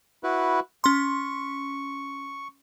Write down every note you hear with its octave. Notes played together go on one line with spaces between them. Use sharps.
E4 F#4 B4
C#4 C6 C#6